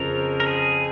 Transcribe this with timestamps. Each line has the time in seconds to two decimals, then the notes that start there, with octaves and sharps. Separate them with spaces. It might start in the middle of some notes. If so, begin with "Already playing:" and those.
Already playing: F2 C#3 F3 A#4
0.40 A#4
0.46 G#4